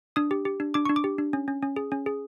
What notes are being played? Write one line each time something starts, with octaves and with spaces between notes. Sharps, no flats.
D4 D#6
G4
G4
D4
D4 D6
D4 C#6
D6
G4
D4
C#4
C#4
C#4
G#4
C#4
G#4